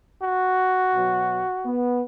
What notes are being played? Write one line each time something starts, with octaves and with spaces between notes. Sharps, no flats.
F#4
B2 F#3
B3